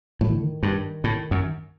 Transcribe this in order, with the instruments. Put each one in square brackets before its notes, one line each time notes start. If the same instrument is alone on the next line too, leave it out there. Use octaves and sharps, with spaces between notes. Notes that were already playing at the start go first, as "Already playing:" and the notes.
[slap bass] A2 [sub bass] F#3
[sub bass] D#3
D3
D#3
[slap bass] G2
A2
F#2